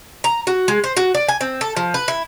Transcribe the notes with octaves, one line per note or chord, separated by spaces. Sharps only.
A#5
F#4
G#3
C5
F#4
D5
G#5
C4
A4
F3
B4
E4